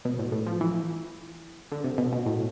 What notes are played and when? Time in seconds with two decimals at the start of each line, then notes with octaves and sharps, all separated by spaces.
0.05 B2
0.19 A2
0.32 A2
0.47 F3
0.61 E3
1.72 D3
1.84 C3
1.98 B2
2.13 B2
2.26 A2